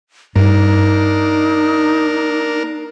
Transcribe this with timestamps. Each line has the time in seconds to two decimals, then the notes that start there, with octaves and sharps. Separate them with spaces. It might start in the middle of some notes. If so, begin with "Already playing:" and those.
0.36 G2 A#3 D4 D#4 A#4